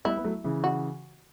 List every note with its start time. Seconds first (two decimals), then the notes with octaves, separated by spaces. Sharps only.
0.05 G3 B3 E4
0.17 B3
0.24 F#3 A3
0.44 C#3 E3
0.64 F#4